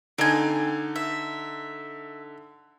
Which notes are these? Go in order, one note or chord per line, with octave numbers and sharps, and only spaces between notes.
D3 C4 D#4 G#5
E5